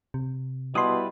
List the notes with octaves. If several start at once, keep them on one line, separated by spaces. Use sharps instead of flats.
C3
B2 G3 E4 B4 C6 D#6